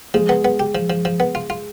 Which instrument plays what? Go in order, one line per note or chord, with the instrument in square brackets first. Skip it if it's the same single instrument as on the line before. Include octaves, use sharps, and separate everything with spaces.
[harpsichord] F3 [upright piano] G#3
[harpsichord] B3
B3
G4
F3
F3
F3
B3
F4
F4